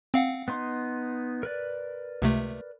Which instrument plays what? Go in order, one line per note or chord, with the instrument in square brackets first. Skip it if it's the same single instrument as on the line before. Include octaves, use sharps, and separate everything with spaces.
[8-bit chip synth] C4 F5 F#5
[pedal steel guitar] B3 D#4 C6
A#4 B4 D5
[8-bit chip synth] C#2 C3 A3